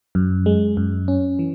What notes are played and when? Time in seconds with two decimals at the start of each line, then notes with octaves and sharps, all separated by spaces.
0.15 F#2
0.46 G#3
0.77 F#2
1.08 C#4
1.39 E3